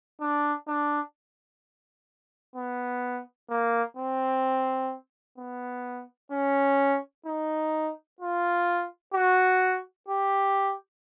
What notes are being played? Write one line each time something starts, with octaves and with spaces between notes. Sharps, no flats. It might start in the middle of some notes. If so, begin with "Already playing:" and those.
D4
D4
B3
A#3
C4
B3
C#4
D#4
F4
F#4
G4